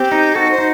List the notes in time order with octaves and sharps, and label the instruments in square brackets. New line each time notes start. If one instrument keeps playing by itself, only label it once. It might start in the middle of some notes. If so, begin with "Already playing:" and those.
Already playing: [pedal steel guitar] C4 [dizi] G4
[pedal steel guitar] D#4
[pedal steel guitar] F#4 [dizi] A4
[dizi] C5
[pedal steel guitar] D#4